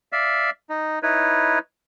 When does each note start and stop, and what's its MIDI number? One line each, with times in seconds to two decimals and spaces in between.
0.13 0.50 74
0.13 0.50 76
0.13 0.50 77
0.70 0.99 63
1.03 1.59 63
1.03 1.59 64
1.03 1.59 71
1.03 1.59 73